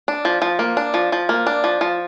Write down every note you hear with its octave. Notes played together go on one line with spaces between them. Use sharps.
D4
F3
F3
A#3
D4
F3
F3
A#3
D4
F3
F3